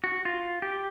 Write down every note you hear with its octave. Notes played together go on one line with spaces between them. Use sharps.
F#4
F4
G4